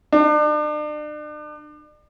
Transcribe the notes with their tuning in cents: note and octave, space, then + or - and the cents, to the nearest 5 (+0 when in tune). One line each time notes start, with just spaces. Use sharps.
D4 +40